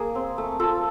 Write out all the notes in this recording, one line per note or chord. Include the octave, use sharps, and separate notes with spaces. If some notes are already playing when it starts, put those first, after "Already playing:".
Already playing: A#3 G#4
C4
A3
F4 A4